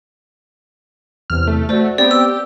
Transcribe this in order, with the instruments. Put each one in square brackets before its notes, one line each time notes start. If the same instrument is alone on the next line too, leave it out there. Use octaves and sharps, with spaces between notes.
[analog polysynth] E2 C3 [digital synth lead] F6
[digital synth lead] A3
[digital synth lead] A3 [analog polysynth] F#4 A5 [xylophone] C5 D5
[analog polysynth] B3 C4 [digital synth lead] G4 [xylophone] D5
[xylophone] E6